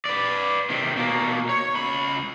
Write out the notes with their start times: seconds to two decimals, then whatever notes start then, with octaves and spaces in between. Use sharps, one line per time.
0.05 B4 D5
0.70 C3 D#3
0.97 B2 A#3
1.49 C#5
1.76 C#2 B5